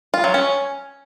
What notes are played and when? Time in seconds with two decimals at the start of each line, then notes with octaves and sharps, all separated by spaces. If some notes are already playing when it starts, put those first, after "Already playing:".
0.14 F4
0.24 F#3
0.34 C#4